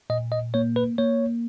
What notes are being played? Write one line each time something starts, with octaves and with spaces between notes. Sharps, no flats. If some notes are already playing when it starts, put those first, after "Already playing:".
A#2 D#5
D#5
A#3 C#5
B4
A#3 C#5